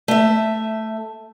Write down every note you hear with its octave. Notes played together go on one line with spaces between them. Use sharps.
A3 E5